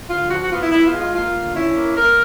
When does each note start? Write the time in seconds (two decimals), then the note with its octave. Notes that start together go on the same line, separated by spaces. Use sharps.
0.08 D3 F4
0.29 F3 F#4
0.40 F#4
0.50 B3 F4
0.61 E4
0.72 B3 E4
0.85 F4
0.92 G#3
0.99 F4
1.13 A#3 F4
1.34 D3
1.54 C#4 E4
1.75 A#3
1.96 A#3 A#4